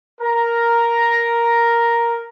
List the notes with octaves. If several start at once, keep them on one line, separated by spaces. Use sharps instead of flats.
A#4 A#5